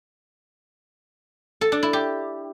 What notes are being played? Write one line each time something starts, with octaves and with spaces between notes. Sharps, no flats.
A4
D4
E4
G4